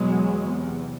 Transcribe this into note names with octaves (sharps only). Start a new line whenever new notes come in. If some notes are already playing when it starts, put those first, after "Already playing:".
Already playing: E2 B2 F#3 G#3
E2 C3